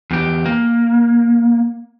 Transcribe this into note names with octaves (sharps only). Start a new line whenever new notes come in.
E2 G4
A#3